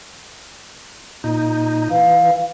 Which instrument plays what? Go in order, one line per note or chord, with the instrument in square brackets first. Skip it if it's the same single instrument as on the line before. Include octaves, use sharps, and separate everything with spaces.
[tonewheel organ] A#2 D#4
[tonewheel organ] E3 [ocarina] F5